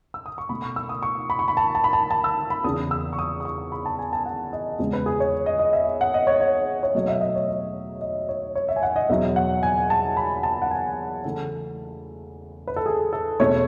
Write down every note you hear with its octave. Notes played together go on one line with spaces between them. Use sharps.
E6
D#6
C#6
B2 A3 B5
C#6
E6
D#6
C#6
B5
C#6
B5
A5
A5
B5
A5
A5
E6
B5
E2 C#3 E3 D#6
E6
C#6
D#6
D#6
C#6
B5
A5
G#5
A5
F#5
D#5
E2 C#3 G#3 B3
B4
G#4
C#5
D#5
D#5
E5
F#5
D#5
C#5
C#5
C#5
B2 F#3 A3 D#5
E5
D#5
C#5
D#5
D#5
C#5
C#5
E5
G#5
F#5
D#5
E2 B2 F#3 E5
F#5
G#5
A5
B5
A5
F#5
G#5
C#3 E3 A3 A4
B4
A4
G#4
A4
E2 B2 A3 C#5